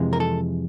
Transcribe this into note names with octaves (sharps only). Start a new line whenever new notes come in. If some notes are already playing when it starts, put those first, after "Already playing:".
Already playing: F2 C3 E3 G#3
A#4
A4